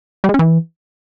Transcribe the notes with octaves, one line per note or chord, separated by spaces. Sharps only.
G3
G#3
C#4
E3